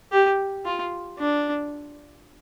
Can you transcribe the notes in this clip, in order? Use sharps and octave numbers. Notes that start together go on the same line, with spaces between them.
G4
F4
D4